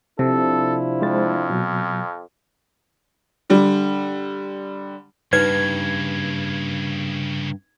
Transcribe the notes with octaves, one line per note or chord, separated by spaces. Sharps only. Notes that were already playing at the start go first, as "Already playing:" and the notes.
C3 F3 D4 E4 A4
F2 G#3 C5 A6
B2 F#3
D3 G3
G2 C#3 A#3 D#4 B4 G#6